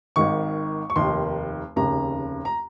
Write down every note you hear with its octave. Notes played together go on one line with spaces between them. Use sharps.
G#1 G#2 D#3 C#6
C#6
F1 D#2 D#3 C6
F1 D#2 C#3 A#5
A#5